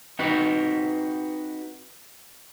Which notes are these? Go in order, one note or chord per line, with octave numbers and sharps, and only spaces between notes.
C4 D#4 F#4 B4